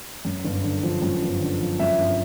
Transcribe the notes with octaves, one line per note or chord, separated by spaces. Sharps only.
F#2
G1
D3
F3
F#2
G1
D3
F3
F#2 E5
G1